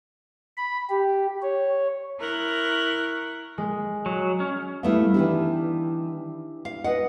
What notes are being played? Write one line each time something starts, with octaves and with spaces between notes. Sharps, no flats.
B5
G4
C#5
E4 A#4 C#6 F#6
G#3
F#3
C#4
G3 A3 B3 E4 E5 F5
D#3 E3 D4 G4 B4
F5
B4 D#5 F#5